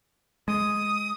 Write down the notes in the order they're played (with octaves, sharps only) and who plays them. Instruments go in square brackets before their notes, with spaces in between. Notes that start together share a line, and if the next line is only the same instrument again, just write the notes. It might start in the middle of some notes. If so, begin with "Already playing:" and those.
[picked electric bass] G#3 [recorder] D#6